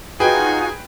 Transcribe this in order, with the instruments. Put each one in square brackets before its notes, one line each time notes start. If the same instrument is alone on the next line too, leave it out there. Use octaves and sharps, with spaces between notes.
[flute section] D#4 F4 F#4 [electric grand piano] G#4 [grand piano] B4 G5 [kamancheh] G#5